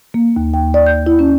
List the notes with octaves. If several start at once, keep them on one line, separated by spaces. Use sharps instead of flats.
A#3
D#2
G5
D5
G6
E4
C#4